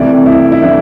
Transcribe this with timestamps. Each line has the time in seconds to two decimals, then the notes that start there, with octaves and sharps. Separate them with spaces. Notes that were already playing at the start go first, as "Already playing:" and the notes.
Already playing: C2 C3 E3 A3 D5
0.26 E4
0.52 E4
0.62 C3 E3 A3 D4